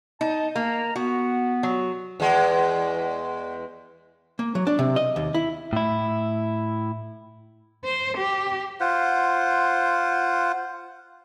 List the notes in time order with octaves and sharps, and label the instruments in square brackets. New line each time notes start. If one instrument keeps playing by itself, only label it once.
[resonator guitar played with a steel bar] D#4 [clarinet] A5
[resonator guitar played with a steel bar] A#3 [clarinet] A#5
[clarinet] B3 [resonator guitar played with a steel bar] F#4
[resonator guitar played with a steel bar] F#3
[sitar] E2 G#3
[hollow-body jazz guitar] A#3
F#3
D4
C3
D#5
D#2
E4
[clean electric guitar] A2 E4
[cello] C5
G4
[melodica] F4 C5 F#5